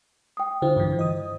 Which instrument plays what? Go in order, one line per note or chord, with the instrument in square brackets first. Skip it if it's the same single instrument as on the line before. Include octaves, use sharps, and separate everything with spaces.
[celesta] G5 D#6
[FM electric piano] D3 E4 F4 [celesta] C5
[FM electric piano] G2 D3 E3
D#5 D#6